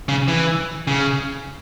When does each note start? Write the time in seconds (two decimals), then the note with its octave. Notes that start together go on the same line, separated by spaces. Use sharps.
0.09 C#3
0.28 E3
0.87 C#3